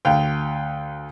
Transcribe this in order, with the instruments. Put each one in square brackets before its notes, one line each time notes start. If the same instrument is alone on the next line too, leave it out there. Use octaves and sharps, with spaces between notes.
[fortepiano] D2 F5 G5